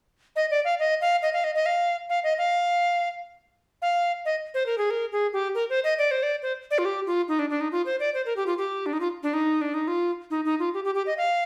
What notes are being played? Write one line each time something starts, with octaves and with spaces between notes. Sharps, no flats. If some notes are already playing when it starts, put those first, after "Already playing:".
D#5
D5
F5
D#5
F5
D#5
F5
D#5
D#5
F5
F5
D#5
F5
F5
D#5
C5
A#4
G#4
A#4
G#4
G4
A#4
C5
D#5
D5
C5
D5
C5
D5
F4
G4
F4
D#4
D4
D4
D#4
F4
C5
D5
C5
A#4
G4
F4
G4
D4
D#4
F4
D4
D#4
D4
D#4
F4
D#4
D#4
F4
G4
G4
G4
D#5
F5